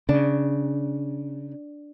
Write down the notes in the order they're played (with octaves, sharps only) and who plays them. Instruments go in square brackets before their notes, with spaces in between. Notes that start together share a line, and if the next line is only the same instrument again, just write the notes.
[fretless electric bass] C#3 [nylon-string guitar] D4